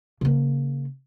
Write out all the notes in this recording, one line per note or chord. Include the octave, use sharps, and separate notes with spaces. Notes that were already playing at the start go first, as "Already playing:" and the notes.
C#3 A#3